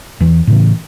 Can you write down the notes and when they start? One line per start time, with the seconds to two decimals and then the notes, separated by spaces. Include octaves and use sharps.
0.21 E2 E3
0.47 A2 C#3 E3